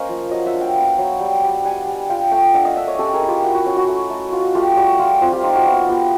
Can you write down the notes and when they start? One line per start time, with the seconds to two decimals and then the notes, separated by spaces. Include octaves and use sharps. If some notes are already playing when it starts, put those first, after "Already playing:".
Already playing: A#3 C#4 C5 D#5 F5
0.09 F3
0.31 F#3 D#5 F5
0.46 E5 F#5
0.54 D4
0.61 F5 G5
0.76 B3
0.98 F#3
1.21 G3
1.43 G3
1.64 G3 F#5 G#5
1.87 G3
2.09 F4 F5 G5
2.32 A3 F5 G5
2.54 D4 E5 F#5
2.65 D#5 F5
2.76 D4 D5 E5
2.87 C#5 D#5
2.98 C#4 G4 A4
3.14 G#4 A#4
3.21 E4
3.28 F4 G4
3.43 E4 F#4
3.55 F#4
3.66 C#4 F#4
3.77 F#4
3.88 A3
4.10 A3
4.32 F4 F#4
4.55 A3 F4 G4
4.77 G3 F#4
4.99 G3 F4
5.21 C4 F4
5.32 F4 G4
5.44 D#4 F4
5.55 F#4
5.66 B3 F4
5.88 B3 F4 G4